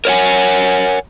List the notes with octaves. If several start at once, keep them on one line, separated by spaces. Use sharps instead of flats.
A#4 C#5 F#5 G#5